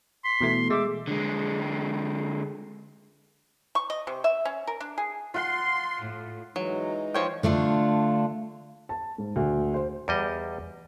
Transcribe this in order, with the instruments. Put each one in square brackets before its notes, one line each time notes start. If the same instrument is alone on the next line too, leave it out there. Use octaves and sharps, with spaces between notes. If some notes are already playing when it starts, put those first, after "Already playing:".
[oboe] C6 [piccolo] B6
[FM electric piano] B2 E3 A3
[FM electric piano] G#3 [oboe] E5 [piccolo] D6
[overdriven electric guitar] D3 G#3
[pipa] C#6
D#5
C3
E5
C#4
A#4
D4
G#4
[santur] F4 F#5 [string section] C6
[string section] A2
[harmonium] E3 G#3 D#4 [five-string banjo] F#3
[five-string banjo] F3 C#5 G5
[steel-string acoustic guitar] D3 A3 D4 F4
[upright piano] A5
G#2
D2
C5
[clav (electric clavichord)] E2 G3 D#5